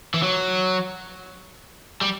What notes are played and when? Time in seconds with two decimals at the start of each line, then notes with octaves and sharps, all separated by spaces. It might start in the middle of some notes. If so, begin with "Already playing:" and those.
0.14 E3
0.23 F#3
2.01 G3